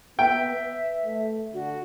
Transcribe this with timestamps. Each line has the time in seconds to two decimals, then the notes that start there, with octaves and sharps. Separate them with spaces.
0.19 B3 E5 G5
0.56 B4
1.05 A3
1.54 D3 F#4